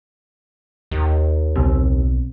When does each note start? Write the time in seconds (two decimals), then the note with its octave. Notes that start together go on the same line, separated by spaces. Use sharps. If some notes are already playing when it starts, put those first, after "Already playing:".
0.91 D#2
1.55 B1 C4